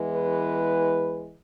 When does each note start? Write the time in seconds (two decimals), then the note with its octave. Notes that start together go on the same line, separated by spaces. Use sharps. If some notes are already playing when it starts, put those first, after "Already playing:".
Already playing: E2 E3 G#3
0.09 B4